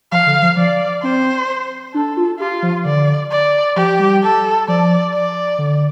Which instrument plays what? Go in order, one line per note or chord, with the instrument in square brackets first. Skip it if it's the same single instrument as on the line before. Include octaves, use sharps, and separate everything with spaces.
[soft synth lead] F3 [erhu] F5
[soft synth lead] D3
F3
[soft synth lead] F3 [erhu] D5
[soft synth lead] C4 [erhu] C5
[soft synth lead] D4 [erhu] A4
[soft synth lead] F4
[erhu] F4 [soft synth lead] G4
[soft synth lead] F3
[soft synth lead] D3 [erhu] D5
[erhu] D5
[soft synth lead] F3 [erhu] G4
[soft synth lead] G3
[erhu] A4
[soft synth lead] F3 [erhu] D5
[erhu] D5
[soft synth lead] D3